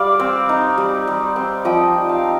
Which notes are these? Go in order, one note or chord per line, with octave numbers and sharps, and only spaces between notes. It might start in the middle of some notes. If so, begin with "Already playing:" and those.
Already playing: G3 D5 F5
C4
D#4
G3
G3
C4
F3 D#5 G5
D#4
F5 A5
D#4